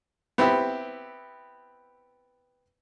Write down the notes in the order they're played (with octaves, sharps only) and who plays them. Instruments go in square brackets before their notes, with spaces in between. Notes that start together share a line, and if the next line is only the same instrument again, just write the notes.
[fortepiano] B3 C4 E4 G4